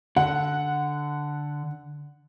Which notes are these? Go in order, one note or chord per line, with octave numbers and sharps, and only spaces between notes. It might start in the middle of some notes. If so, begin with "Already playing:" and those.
D3 F#5